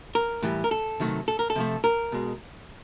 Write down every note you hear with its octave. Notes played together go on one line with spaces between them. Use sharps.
A#4
A2 E3 G3
A#4
A4
C3 D#3 F#3 A3
A4
A#4
A4
C3 F3 A3
A#4
B2 G#3